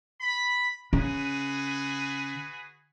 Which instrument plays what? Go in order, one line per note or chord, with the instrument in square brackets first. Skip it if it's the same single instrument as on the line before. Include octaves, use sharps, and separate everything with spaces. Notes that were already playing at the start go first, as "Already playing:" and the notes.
[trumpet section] B5
[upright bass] C#3 [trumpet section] F#4 G#4 B4